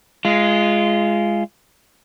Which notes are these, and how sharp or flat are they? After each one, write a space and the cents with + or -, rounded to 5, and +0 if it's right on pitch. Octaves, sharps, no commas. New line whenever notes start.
G#3 +5 F4 -20